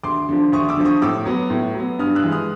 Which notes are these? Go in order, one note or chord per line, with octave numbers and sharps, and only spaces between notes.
D2 C6 D6
D3 F3
D2 C#6 D#6
D6 E6
D3 F3
C#6 D#6
A2 D6 E6
F#3 B3
A2
F#3 B3
G2 D#6 F6
E6 F#6
E3 G#3
D#6 F6